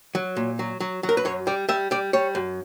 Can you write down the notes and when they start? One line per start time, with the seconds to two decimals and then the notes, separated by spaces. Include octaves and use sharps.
0.15 F#3
0.37 A#2
0.59 F#3
0.80 F#3
1.03 F#3
1.09 A#4
1.17 B4
1.25 F#2 C#5
1.47 G3 D5
1.69 G3 E5
1.91 G3 D5
2.13 G3 C#5
2.35 F#2